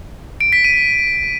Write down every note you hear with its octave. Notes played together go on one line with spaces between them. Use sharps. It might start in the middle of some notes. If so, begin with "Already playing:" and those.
D7
B6
D#7